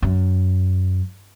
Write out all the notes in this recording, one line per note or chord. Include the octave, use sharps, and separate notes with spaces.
F#2